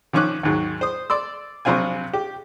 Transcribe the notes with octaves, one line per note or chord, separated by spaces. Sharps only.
D#3 F3 C#4 C#6 D6 F#6
D#2 G#2 F#3
C5 D#6
D5 C6 E6
A#1 C3 F#3 C4 F4 G#5
G4